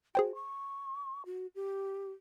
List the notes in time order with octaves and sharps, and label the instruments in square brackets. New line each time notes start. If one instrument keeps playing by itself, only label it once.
[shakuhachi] F#4 [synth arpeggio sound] G#4 C5 G5
[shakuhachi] C#6
F#4
G4